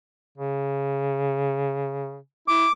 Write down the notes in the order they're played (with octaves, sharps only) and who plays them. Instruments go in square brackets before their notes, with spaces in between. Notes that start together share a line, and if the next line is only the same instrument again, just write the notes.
[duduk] C#3
[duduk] E4 [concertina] D6